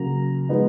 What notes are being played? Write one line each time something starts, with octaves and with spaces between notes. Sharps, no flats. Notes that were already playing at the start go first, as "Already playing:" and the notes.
Already playing: C#3 F#3 A#3 A#5
F3 G#3 B3 D#4